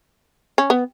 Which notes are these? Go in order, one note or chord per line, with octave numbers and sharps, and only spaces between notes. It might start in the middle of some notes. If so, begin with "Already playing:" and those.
C#4
B3